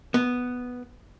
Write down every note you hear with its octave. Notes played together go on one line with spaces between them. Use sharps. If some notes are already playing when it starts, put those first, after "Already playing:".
B3